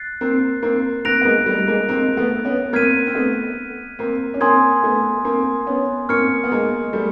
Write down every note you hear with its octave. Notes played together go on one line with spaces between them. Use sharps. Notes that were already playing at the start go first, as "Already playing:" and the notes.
Already playing: F#6 A6 C7
A#3 C4
A#3 C4
A#3 C4 F#6 A#6 D7 F7
B3
G#3 A#3
G3 A3
G#3 A#3
A#3 C4
A3 B3
B3 C#4
A#3 C4 F6 G#6 B6 D#7
C4
A3 B3
A#3 C4
C#4
A#3 C4 G#5 C6 D#6 G#6
A3 B3
A#3 C4
B3 C#4
A#3 C4 C#6 F6 G#6 C#7
B3
G#3 A#3
G3 A3